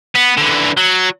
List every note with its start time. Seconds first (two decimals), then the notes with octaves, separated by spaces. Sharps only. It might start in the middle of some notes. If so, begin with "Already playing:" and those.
0.16 B3
0.38 D3 E3
0.77 F#3